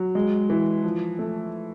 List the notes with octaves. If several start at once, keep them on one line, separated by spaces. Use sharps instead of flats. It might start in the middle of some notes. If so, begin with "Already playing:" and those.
Already playing: F#3
G#3
E3
F3
A3